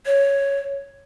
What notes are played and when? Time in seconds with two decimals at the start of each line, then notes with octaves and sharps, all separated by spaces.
0.06 C#5